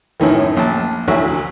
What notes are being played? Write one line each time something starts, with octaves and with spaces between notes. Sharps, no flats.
F#2 A2 D#3 E3
A#1 A5
A1 D2 F#3 E4 F#4